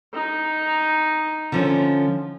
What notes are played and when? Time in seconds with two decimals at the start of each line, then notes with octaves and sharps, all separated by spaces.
0.14 D#4
1.52 D3 F3 C#4